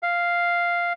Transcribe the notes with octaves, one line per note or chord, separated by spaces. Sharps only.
F5